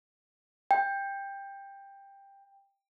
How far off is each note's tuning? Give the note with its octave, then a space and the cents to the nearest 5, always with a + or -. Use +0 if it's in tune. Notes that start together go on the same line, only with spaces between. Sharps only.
G5 +15